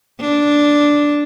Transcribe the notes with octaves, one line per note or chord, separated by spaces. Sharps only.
D4